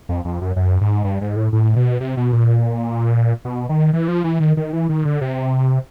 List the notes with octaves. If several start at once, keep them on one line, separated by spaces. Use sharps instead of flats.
F2
F2
F#2
F#2
G#2
G2
G#2
A2
A2
B2
C3
B2
A#2
B2
D#3
E3
F3
E3
D#3
D#3
E3
D#3
D3
C3